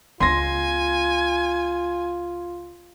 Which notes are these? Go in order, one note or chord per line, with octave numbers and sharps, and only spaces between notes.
C#2 B3 F4 G#5 C6 A#6